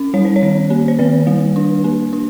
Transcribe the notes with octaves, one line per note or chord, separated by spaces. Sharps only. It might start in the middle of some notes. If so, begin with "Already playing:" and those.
Already playing: C#4
G3 C#5
C5
C#5
D#3
A#3
C5
D#3 B4
G3
D4
A#3
D4